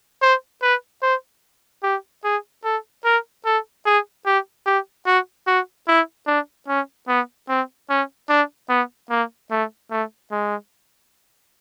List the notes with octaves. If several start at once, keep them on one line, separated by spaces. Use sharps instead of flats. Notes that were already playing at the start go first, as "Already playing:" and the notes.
C5
B4
C5
G4
G#4
A4
A#4
A4
G#4
G4
G4
F#4
F#4
E4
D4
C#4
B3
C4
C#4
D4
B3
A#3
A3
A3
G#3